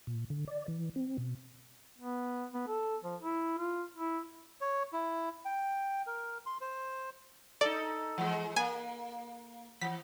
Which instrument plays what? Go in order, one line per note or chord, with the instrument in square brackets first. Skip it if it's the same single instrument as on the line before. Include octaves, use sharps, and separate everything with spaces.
[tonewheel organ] A#2
D3
D5
E3
C4
B2
[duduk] B3
B3
A4
F3
E4
F4
E4
[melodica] C#5
E4
G5
A#4
C6
C5
[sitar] D#4 A4 [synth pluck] D5
[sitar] E3 G#3
[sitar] A#3 [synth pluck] G#5
[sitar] E3 [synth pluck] B6